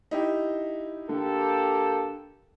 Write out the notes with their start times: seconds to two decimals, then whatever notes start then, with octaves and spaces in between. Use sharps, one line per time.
0.11 D#4 E4 G4
1.09 D3 A#3 G4 A4